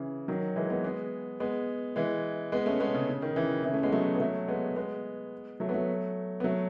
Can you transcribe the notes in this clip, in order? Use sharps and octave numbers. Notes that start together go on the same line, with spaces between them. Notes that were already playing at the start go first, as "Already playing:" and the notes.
Already playing: C#3 E3
D#3 F#3
E3 G#3
G#3 B3
G#3 B3
G#3 B3
E3 G#3
G#3 B3
A3 C#4
G#3 B3
C#3
C#3
D#3
C#3 E3
C#3 E3
A3 C#4
G#3 B3
F#3 A3
B3
F#3 A3
G#3 B3
G#3 B3
F#3 A3
B3
F#3 A3
B3
F#3 A3